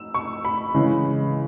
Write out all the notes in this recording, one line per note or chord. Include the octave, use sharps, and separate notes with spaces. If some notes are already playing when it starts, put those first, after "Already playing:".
Already playing: E6
C#6
B5
C#3 E3 G#3